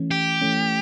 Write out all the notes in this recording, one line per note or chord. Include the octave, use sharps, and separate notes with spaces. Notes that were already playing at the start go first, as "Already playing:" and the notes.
Already playing: E3 A3 C#4
G4
E3 A3 C#4